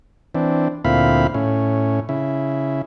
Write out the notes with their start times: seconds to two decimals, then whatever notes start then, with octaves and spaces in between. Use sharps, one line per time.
0.35 E3 C4 D4
0.85 D2 A#2 C4 E4 F5 B5
1.34 A2 C#4
2.09 C#3 E4